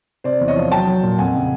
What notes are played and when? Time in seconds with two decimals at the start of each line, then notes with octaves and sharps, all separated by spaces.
0.24 C3 C5 D5
0.41 E2
0.48 C#5 D#5
0.56 F3
0.71 F#3 G5 A5
0.87 F#3
1.03 A#2
1.18 F2 F#5 G#5
1.35 C#3